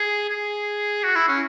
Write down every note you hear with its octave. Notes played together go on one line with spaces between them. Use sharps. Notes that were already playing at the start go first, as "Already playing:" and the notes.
Already playing: G#4
G#4
F#4
E4
C#4